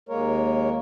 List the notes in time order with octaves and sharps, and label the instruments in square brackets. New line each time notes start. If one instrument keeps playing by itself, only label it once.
[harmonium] D#2 G#3 A#3 A#4 C#5